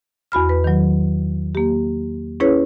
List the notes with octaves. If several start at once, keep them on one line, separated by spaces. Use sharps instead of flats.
E2 F#4 B5 F6
B4
D#3 F#3
A#3 G4
C#4 E4 G#4 B4 C#5